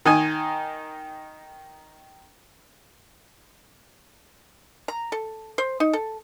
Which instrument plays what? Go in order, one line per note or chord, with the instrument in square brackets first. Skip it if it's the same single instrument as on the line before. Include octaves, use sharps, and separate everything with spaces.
[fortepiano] D#3 D#4 G#5
[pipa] A#5
A4
C5
D#4
A4